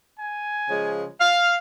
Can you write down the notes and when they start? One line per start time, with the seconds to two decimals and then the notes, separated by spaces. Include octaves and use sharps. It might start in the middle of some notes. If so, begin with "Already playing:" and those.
0.18 G#5
0.70 C#3 F3 G#3
1.21 F5